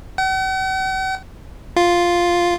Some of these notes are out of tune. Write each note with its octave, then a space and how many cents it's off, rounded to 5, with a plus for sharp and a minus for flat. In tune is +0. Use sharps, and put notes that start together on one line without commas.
F#5 +45
F4 +0